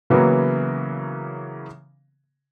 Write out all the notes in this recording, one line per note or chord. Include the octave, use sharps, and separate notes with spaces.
C#3 E3 F#3 A#3 B3